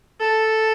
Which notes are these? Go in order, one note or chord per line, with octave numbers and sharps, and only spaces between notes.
A4